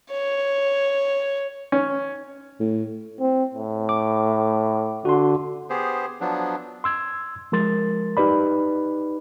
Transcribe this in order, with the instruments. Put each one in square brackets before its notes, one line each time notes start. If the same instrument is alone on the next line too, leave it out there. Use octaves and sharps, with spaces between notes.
[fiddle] C#5
[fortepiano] C#4
[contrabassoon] A2
[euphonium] C4
A2
[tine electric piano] D6
[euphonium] D3 [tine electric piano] F#4 C6
[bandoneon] B3 G4 G#4 C5
F3 F#3 B3 D4
[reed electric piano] C6 E6 G#6
F3 G#3 A#4 C6 A6
D#4 G4 B4 D5 B5